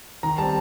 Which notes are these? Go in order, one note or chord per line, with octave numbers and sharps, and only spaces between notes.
D#3 A#5
G3 C4 A5